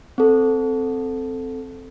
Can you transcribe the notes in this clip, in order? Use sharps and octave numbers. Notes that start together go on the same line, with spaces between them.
C4 A4